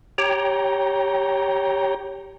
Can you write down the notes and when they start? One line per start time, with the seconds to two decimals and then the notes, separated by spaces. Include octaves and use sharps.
0.18 G4 C#5 G5 A#5